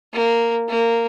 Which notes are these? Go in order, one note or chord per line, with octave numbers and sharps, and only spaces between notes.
A#3
A#3